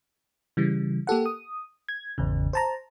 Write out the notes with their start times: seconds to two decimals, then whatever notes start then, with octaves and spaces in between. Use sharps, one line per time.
0.57 C#3 E3 G3
1.07 A#3 G4 A4 F#5
1.26 D#6
1.89 G#6
2.18 G#1 E2 C#3
2.53 C5 A5 A#5